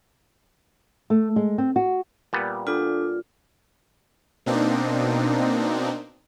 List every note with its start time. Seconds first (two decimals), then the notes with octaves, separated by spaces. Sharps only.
1.10 A3
1.36 G#3
1.58 C4
1.76 F#4
2.33 A#2 G3 B3
2.67 D4 F4 A4 D6
4.46 B2 A#3 C4 D4 D#4